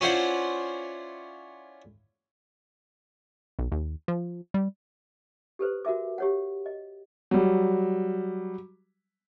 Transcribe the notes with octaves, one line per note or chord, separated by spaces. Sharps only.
C#4 D4 E4 F4 C5 F#5
B1
D#2
F3
G3
G4 A4 B4 C5
F#4 A#4 E5 D6
G4 C#5 F#5
D#5
F#3 G3